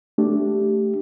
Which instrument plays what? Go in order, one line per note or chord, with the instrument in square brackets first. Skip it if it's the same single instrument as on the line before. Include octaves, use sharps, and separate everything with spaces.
[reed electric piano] A3 D4 G4